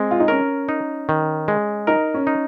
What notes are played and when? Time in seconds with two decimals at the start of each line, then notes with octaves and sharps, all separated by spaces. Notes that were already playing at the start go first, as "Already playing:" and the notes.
Already playing: G#3 C4
0.11 F4
0.20 D#4
0.28 C#4 A#4
0.69 D#4
1.09 D#3
1.48 G#3
1.87 D#4 A#4
2.14 C#4
2.27 D#4